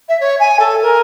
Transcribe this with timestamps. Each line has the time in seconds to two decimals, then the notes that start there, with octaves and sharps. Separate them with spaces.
0.08 E5
0.20 C#5
0.39 G#5
0.59 A4
0.82 A#4